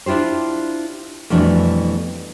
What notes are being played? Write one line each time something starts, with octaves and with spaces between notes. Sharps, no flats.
D4 E4 F4 G4 C5
F2 B2 E3 G3 A3 D4